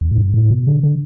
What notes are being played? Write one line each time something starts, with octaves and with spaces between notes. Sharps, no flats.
E2
A2
G2
A2
B2
D3
D3